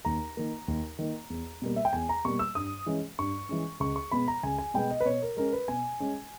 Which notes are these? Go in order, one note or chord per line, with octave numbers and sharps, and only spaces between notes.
D#2 A#5
D#3 A#3
D#2
D#3 A#3
E2
B2 G3 A#3
E5
G5
E2 G#5
A#5
B2 G3 A#3 C#6
E6
G2 D#6
E3 G#3 C#4
G2 C#6
E3 G#3 C#4
C#2 C#6
C#6
B2 G#3 B3 B5
A#5
C#2 G#5
G#5
B2 G#3 B3 G5
D#5
B4
B2 C#5
A#4
G#3 C#4 A#4
B4
B2 G#5
G#3 C#4